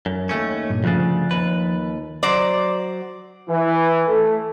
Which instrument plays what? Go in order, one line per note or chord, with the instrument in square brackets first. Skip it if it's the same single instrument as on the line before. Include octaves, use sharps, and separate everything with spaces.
[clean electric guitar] F#2
D#2 A3 C#4
[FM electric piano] G2 A#2
[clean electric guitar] D2 C#3 [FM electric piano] F3 F#6 A6
[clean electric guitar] D#2 B4
[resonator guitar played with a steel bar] F#3 C5 D5
[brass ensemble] E3
A3